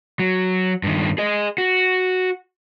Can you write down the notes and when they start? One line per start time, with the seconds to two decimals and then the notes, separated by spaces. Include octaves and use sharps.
0.19 F#3
0.83 G2 D#3
1.18 G#4 D#5
1.58 F#4